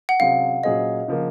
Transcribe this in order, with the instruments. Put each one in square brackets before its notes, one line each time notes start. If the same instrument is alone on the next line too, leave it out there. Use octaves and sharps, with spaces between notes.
[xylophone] F#5
[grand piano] C3 F#3 C#4 G#4 C5 [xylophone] F5
[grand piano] A#2 F#3 C#4 G#4 C5 [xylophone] D#5
[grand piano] C#3 F3 A#3